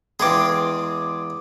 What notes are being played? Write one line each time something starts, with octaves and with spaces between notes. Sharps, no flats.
E2 G#3 G#4 C6 D6